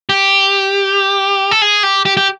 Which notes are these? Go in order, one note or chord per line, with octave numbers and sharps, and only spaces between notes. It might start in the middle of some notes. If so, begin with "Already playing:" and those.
G4
A4
G#4
G4
G4
G4